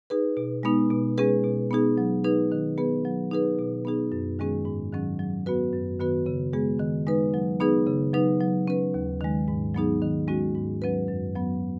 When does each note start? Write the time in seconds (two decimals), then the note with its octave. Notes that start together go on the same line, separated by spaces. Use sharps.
0.10 D#4 G#4 B4
0.37 B2
0.63 G#3 B3 D#4
0.91 B2
1.18 G#3 C#4 G#4 B4
1.44 B2
1.71 B3 D#4 G#4
1.98 F#3
2.24 D#4 G#4 B4
2.52 D#3
2.78 B3 G#4 B4
3.05 F#3
3.31 D#4 G#4 B4
3.59 B2
3.85 B3 D#4 G#4
4.12 F#2
4.39 D#3 G#3 C#4 G#4
4.65 G#2
4.92 D#3 F#3 C#4
5.19 F#3
5.46 B3 F#4 B4
5.73 F#2
6.00 D#3 B3 F#4 B4
6.26 C#3
6.53 G#3 B3 G#4
6.80 D#3
7.07 G#3 D#4 B4
7.34 F#3
7.60 B3 D#4 G#4 B4
7.86 C#3
8.13 F#3 D#4 B4
8.41 F#3
8.68 C#4 B4
8.94 D#2
9.21 D#3 G#3
9.48 G#2
9.75 F#3 B3 D#4 G#4
10.02 D#3
10.28 G#3 C#4 F#4
10.55 G#2
10.82 F#3 C#4 B4
11.08 F#2
11.36 F#3 B3